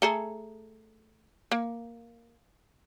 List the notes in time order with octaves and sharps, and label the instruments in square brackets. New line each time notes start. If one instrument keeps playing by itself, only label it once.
[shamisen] A3 G#4 A4 [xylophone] A#5 C#7 G7
[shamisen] A#3